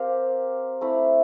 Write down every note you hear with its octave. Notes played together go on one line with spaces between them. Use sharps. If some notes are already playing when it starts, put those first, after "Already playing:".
Already playing: C4 G4 A#4 F5
A3 C4 E4